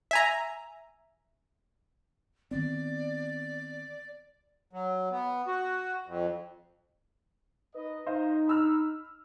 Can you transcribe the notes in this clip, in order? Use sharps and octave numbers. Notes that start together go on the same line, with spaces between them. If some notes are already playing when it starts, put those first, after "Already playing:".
E5 G#5 A#5
D#3 B3 C4 D5
F#3
B3
F#4
F2
D#4 B4 D#5
D#4 C5 D#5 F5
B5 E6 F6